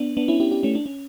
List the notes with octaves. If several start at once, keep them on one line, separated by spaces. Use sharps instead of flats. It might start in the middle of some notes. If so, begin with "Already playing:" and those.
Already playing: B3 D4
B3 D4
C#4 E4
E4 G4
E4 G4
A3 C#4
D4
C#4